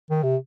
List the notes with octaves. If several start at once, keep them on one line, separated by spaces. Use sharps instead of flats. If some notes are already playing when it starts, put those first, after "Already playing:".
D#3
C3